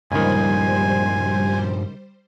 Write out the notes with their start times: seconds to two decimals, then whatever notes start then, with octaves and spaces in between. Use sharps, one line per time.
0.12 C#2 G2 A#2 D#3 F3 G3 C5 G#5